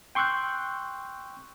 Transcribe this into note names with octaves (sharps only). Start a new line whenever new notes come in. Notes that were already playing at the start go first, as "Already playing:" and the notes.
G5 C6 C#6 E6 F#6 G6